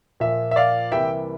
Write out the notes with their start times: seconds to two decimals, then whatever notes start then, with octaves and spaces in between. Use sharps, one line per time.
0.20 A#2 F3 A#3 E5
0.51 E5
0.56 D5 F5
0.92 C2 C3 E3 G3 A#3 E5 G5